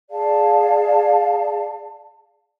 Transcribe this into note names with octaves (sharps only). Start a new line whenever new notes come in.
G#4 D5 F5 A5